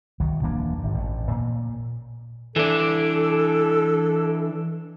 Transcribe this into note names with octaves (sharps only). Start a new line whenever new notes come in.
C2 D#3 F#3
D#1 E3 A#3 D4
G#1 G2
A1 A3
A#2
E3 D4 A4